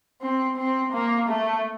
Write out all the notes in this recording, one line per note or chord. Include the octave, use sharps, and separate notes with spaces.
C4
C4
A#3
A3